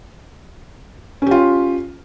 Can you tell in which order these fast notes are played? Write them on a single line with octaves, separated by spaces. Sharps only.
C#4 G4 F4